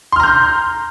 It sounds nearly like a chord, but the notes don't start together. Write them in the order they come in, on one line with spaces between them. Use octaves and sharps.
C6 F6 A#5 G6